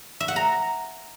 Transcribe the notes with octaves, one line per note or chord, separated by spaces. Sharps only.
E5
F#5
A#5